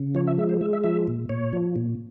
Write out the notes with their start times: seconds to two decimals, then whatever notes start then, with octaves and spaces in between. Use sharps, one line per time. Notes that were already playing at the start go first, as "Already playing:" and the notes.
Already playing: C#3
0.15 F3 C#5
0.27 E5
0.38 G#3 E5
0.49 C5
0.61 G#3 E5
0.73 E5
0.84 F3 E5
1.07 A#2
1.29 A#2 C#5
1.53 F3
1.76 A#2